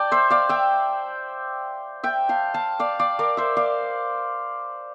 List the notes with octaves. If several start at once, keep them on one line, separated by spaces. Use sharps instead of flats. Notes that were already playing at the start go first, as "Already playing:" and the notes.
Already playing: D5 G5 A5
C5 E5
D5 F5
E5 G5
E5 G5
F5 A5
F5 A5
D5 F5
D5 F5
A#4 D5
C5 E5
D5 F5